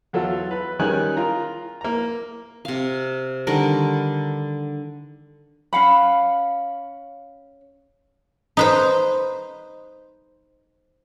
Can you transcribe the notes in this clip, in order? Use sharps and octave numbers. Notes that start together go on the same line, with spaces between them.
E2 F#3 F4 A4
B4
D#3 G3 C#4 G#4 G#5 F#6
F4 A#4 A#5
A#3 A#5
C3 F5
D3 D#3 G3 A#4
C#4 F5 F#5 B5
D#4 B4 C5